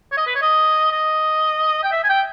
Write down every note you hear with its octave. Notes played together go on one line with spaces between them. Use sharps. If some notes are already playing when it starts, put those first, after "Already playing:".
C#5
D#5
B4
C#5
D#5
D#5
G5
E5
G#5
G5